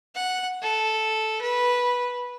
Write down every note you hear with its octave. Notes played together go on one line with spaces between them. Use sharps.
F#5
A4
B4